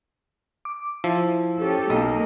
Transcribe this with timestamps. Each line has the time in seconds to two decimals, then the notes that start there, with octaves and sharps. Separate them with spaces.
0.65 D6
1.04 F3 E4
1.59 C#4 G4 A4
1.90 B1 A#3 D#5